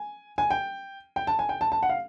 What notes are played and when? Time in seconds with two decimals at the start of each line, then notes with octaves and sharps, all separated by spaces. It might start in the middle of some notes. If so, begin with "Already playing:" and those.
Already playing: G#5
0.38 G#5
0.50 G5
1.16 G5
1.27 A5
1.39 G#5
1.49 G5
1.61 A5
1.72 A5
1.83 F#5
1.89 F5